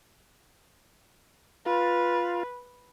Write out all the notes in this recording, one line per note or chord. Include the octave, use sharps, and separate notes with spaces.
F4 B4